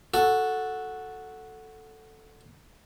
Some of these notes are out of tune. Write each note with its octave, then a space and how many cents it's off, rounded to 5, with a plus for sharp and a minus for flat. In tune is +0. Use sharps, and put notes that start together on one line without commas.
F#4 -5 A4 +0